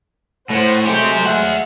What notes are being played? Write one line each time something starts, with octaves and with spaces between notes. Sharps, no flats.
A2 C5 F#5
F#3 G#3 A3 G4 C5
E5 F#5